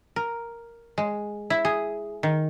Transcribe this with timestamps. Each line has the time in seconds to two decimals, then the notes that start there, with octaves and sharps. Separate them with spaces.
0.16 A#4
0.98 G#3
1.50 E4
1.65 G#4
2.23 D#3